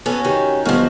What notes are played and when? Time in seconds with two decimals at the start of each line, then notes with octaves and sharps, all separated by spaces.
0.06 F#3 B3 C#4 A4
0.25 D#3 G4
0.65 G1 D#2 F3 F#4 F6